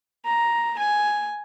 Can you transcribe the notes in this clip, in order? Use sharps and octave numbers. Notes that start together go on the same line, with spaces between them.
A#5
G#5